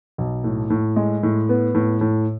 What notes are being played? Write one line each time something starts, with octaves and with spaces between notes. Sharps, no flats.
B1
A2
A2
G#3
A2
B3
A2
A2